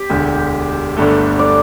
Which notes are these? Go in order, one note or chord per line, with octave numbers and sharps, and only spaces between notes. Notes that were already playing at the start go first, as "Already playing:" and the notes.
Already playing: G4
E1 D2 D3
G1 G2 D3 A3
D5